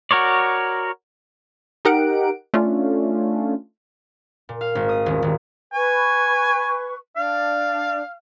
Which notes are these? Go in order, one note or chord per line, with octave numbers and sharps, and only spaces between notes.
F#4 A#4 C#5 D5
D#4 G4 A#4 F#5 D7
A3 C#4 D4 F4
A#2
F5
G#1
D#6
D#1
D#1
B4 G#5 C#6
D4 D5 F5